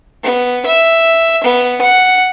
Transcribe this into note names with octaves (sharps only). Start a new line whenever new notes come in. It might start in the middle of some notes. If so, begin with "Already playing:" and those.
B3
E5
B3
F#5